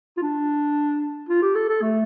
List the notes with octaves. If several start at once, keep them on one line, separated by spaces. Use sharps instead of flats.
F4
D4
F4
G4
A4
A4
A3